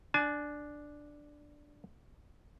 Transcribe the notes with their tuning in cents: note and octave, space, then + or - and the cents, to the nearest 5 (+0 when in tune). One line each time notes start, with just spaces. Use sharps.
D4 +0 G#5 +40